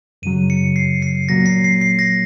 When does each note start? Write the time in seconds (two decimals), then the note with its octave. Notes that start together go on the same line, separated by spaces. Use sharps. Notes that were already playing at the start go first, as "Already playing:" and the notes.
0.22 F#2 C#3 F#3 D#7
0.50 C#7
0.76 C7
1.02 C7
1.29 A#2 F#3 A#3 A#6
1.46 C7
1.64 C7
1.81 C7
1.99 A#6